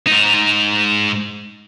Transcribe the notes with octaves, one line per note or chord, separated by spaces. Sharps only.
G#2 D#4